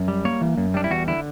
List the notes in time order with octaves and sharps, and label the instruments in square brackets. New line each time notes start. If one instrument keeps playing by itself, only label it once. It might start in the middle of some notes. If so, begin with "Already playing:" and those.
Already playing: [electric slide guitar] F#2
G3
A#3 C#5
E3
F#2
G3 D4
E4
E2 F#4
D3 E4